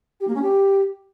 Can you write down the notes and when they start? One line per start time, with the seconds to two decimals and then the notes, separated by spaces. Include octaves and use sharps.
0.20 G4
0.27 A#3
0.34 C#4
0.41 G4